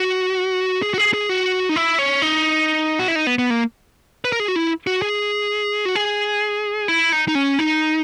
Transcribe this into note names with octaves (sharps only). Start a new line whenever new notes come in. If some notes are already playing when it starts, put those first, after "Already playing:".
Already playing: F#4
G#4
F#4
G#4
G#4
F#4
D#4
E4
C#4
D#4
F#4
E4
D#4
B3
B3
A#3
B4
A#4
G#4
F#4
E4
F#4
G#4
F#4
G#4
E4
D#4
D#4
C#4
D#4